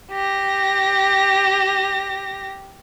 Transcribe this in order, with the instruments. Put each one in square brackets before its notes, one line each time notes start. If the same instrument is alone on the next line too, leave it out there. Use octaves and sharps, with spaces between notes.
[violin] G4 A#6